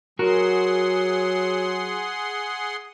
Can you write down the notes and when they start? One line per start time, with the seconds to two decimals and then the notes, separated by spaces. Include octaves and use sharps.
0.19 F#3 F#4 G#4 A#4 F#5 C6